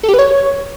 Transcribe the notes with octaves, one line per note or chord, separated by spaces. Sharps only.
A4
G4
B4
C#5